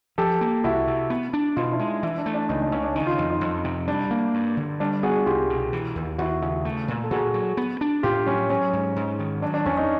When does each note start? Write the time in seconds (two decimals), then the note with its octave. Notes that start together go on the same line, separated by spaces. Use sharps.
0.18 F3 G4 A4
0.41 A#3
0.64 C2 E4 F#4
0.87 C3
1.10 B3
1.33 D4
1.56 B2 D#4 F4
1.72 D4 E4
1.79 G#3
2.03 E3 D4 E4
2.18 D4
2.26 A3
2.34 D4
2.49 C#2 C#4 D#4
2.61 D4
2.72 C#3 C#4
2.83 D4
2.95 D#3 C#4 D#4
3.07 D#4 F4
3.19 F2
3.30 D#4 F4
3.41 F2
3.64 C3
3.88 G3 D4
4.11 A#3
4.34 G2
4.57 D3
4.80 G3 D4
5.03 B3 F#4 G#4
5.26 C2 F4 G4
5.50 B2
5.73 E3
5.95 D#2
6.18 D#2 E4 F#4
6.42 C#3 E4 F#4
6.65 A3
6.88 A#2
7.04 A4
7.11 A#2 F#4 G#4
7.34 F#3
7.57 B3
7.81 D4
8.03 A2 F4 G4
8.27 F#3 C#4
8.50 F#3 C#4
8.73 G#2
8.96 G#2
9.19 D#3
9.42 F#3 D4
9.54 D4
9.66 E2 C#4
9.77 C#4 D#4